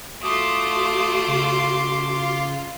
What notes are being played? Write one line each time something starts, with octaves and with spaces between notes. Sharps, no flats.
A3 F4 F#4 C6 D6 D#6
C#3
F4